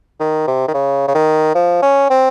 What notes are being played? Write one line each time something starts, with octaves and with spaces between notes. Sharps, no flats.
D#3
C3
D#3
C#3
C#3
D#3
F3
C#4
C4